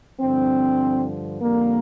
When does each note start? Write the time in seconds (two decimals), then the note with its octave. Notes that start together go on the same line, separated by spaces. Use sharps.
0.19 G2 D3 F3 C4
1.41 F2 D3 G3 A#3